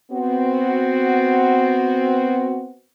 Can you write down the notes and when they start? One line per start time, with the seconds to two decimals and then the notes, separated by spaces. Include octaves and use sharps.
0.11 B3 C4 F#4